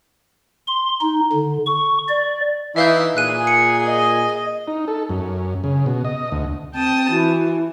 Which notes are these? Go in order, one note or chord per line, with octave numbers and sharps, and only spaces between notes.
C6
D#4
D3
C#6
D5
E3 D#4 E4 E5 F5 G6
A#2 G#4 F#6 D#7
C#7
D#5
D#4
A4
F#2
C#3
B2
D#5
D2
C4 G5 A5 D#6
E3 F#4